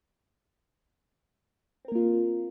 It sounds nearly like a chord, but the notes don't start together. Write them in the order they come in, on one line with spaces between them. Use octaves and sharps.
C4 A#4 A#3 F4